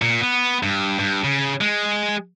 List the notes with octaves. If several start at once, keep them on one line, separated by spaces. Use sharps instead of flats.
A#2
B3
G2
G2
C#3
G#3